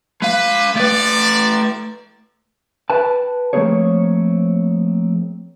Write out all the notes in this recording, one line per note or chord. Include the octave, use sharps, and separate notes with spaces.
G#3 B4 F5
A3 B4 D5
B4 G5 A5
F3 A3 A#3 C4 G#4 C#5